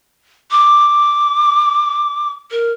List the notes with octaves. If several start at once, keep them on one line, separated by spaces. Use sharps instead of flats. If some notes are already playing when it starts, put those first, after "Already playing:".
D6
A#4